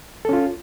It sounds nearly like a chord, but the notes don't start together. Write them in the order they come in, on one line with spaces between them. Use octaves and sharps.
A4 C#4 F4